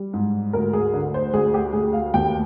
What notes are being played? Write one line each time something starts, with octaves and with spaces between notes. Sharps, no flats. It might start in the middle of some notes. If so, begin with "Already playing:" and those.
Already playing: G3
G#2
D2 A#4
G#4
D3
C5
D2 G#4
G4
D2 G#4
F5
D#2 G5